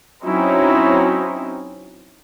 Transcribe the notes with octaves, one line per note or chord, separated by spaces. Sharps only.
F#3 C4 C#4 D#4 E4